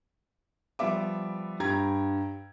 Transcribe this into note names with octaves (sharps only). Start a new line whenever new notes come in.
F3 G3 B3 E5 D6
G2 G4 A#5 G#6